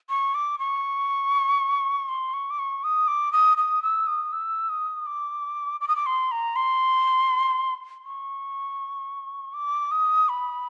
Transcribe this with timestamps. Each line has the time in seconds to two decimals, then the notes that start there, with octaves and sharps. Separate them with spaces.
0.10 C#6
0.34 D6
0.59 C#6
2.09 C6
2.34 C#6
2.50 D6
2.59 C#6
2.84 D#6
3.08 D6
3.32 D#6
3.58 D#6
3.83 E6
4.07 D#6
4.32 E6
4.69 D#6
5.06 D6
5.81 D6
5.88 D#6
5.96 D6
6.06 C6
6.31 A#5
6.56 C6
8.05 C#6
9.54 D6
9.91 D#6
10.29 B5